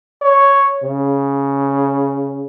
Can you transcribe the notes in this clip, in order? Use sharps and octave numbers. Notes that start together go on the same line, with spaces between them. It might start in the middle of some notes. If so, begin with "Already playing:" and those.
C#5
C#3